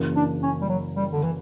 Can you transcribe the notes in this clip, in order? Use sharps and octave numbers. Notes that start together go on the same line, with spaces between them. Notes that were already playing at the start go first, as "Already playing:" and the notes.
Already playing: F#1 F#2 C#3 E3 A#3
D4
C#4
G3
F#3
G3
D3
E3